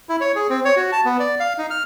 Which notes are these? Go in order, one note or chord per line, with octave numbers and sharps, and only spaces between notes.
E4
C#5
G#4
C4
C#5
F#4
A5
B3
D5
F5
D#4
F6